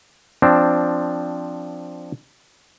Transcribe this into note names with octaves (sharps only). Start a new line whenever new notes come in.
F3 C4 D4